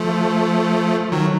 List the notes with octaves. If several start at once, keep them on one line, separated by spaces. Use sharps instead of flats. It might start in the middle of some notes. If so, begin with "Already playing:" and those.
Already playing: F3 A3
D#3 F#3